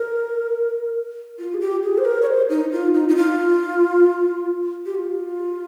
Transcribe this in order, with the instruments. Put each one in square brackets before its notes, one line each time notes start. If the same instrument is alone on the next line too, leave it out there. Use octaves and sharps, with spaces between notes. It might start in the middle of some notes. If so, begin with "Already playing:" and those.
Already playing: [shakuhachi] A#4
F4
G#4
G4
G#4
C5
A#4
C#5
C5
D#4
F4
D#4
D#4
F4
G4
F4